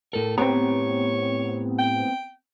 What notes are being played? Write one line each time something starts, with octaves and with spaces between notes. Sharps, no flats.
A2 A4 A#4
A2 B3 C4 G4 C#5 A#5
G5